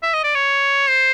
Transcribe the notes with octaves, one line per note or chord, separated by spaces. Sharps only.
E5
D#5
D5
C#5
C5